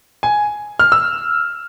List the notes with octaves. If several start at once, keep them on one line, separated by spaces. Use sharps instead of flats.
G#5
F6
E6